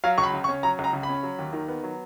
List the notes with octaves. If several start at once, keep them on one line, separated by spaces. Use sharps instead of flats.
F#3 F5
C#2 C#6
B5
C#3
C#6
C#4
F#3 A#5
C#2 A#5
C#3
B5
C#4
F#3
D#2
D#3
B3
F#3